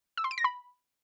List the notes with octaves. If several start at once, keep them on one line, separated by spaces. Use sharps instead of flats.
E6
C6
D7
A#6
B5